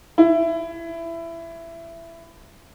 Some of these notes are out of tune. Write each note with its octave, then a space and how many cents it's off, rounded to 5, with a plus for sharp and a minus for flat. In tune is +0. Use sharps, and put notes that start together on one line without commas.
E4 +20